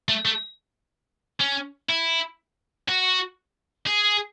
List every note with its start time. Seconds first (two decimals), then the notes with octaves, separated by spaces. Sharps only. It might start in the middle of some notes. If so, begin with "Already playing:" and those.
0.08 A3
0.25 A3
1.40 C#4
1.89 E4
2.88 F#4
3.86 G#4